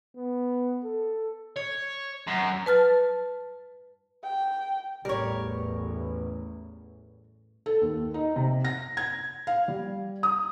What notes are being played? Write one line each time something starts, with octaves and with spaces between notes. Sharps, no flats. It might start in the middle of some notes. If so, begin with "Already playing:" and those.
B3
A4
C#5
F#2
B4 A5 F6 A6
G5
A1 E2 G3 A#4 C#5
A4
D#2
D#4
C3
A#6
G#6
F5
G3
D#6